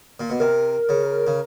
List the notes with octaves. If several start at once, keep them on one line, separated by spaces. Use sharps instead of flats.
A#2
B2
C3 A#4
C#3
C#3